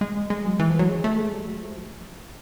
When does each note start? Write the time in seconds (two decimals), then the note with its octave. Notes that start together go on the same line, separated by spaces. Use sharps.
0.01 G#3
0.30 G#3
0.45 F#3
0.60 E3
0.70 F3
0.79 F#3
0.89 G#3
1.04 A3
1.18 G#3
1.33 G3
1.47 F#3
1.62 F3